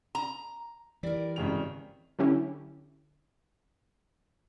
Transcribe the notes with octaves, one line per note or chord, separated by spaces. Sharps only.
A#5
E3 G3 A#4 D5
G#1 C#3 G5 F7
D3 F#3 C#4 E4 G4